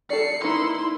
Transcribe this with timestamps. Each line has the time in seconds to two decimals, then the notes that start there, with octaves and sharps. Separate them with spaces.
0.10 A4 D5 C7 C#7
0.44 A#3 D#4 E4 B4 C6